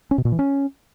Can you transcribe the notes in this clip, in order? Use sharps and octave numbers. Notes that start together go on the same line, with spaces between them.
C#4
B2
A#2
E3
C#4